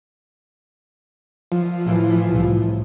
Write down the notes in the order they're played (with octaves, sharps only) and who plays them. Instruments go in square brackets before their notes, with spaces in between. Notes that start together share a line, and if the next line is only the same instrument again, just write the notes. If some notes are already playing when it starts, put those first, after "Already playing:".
[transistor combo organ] F3
[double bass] A2 E3
C2 A2